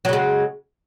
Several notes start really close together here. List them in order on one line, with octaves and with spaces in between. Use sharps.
F#3 C#3 G#3